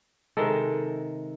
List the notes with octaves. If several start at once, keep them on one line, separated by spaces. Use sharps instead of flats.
C3 D#3 G#3 A4